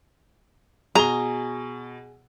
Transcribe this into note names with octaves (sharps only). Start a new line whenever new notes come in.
B2 G#4 A#5 G7